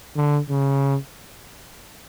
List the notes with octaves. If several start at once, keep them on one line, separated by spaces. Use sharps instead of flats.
D3
C#3